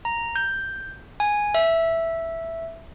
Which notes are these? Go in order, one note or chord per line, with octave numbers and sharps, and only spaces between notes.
A#5
G6
G#5
E5